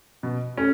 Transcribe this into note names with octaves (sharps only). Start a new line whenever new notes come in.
B2
A3 C#4